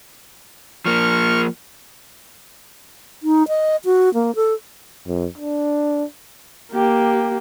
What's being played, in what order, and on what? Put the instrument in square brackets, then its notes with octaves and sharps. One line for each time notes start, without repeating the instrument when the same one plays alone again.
[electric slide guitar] F3 A#3 [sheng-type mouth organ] C#6 F6
[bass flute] D#4
D#5
F#4
A#3
A4
[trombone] F2
D4
[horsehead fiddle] A#3 G4